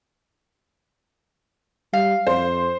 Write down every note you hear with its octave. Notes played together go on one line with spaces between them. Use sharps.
G3 F5
F2 C5